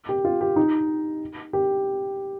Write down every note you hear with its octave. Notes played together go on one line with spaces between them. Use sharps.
G4
F4
G4
D#4
G4